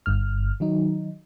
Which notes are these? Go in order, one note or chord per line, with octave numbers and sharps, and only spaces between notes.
G1 G2 F6
D#3 F#3 D#4